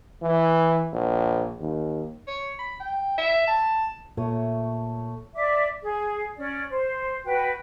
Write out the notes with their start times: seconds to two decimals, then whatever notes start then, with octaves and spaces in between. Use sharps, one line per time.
0.22 E3
0.93 A#1
1.60 D#2
2.27 C#5
2.59 B5
2.80 G5
3.18 E5
3.47 A5
4.17 A#2 A3 C#5 D#6
5.35 D5 E5 D6
5.83 G#4
6.37 C#4 D5
6.70 C5
7.24 F#4 B4 G5